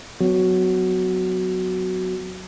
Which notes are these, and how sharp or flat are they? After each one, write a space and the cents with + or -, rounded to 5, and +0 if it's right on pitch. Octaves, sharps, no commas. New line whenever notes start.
F#3 +0 B3 +40 F#4 +0